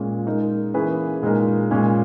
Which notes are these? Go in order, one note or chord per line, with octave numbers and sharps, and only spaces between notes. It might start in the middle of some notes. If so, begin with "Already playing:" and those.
Already playing: A#2 G#3 C#4
G#3 D#4 A#4
E3 A#3 C#4 G#4 B4
A#2 G#3 D#4 A#4
A#2 G#3 C#4